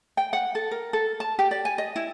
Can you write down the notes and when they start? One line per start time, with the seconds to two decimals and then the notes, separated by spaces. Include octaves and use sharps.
0.17 G5
0.33 F#5
0.55 A4
0.71 A#4
0.93 A4
1.20 A5
1.39 G4
1.51 D5
1.65 G#5
1.78 D#5
1.96 E4